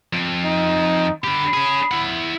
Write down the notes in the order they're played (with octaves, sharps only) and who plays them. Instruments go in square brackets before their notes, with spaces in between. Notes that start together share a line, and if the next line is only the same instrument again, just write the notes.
[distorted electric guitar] F2
[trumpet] D#4
[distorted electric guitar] D3 G4 [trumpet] B5
[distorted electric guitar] C#4 G#4
E4 F#5